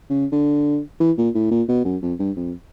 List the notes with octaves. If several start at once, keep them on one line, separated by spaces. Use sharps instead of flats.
C#3
D3
E3
A#2
A2
A#2
B2
F#2
F2
G2
F2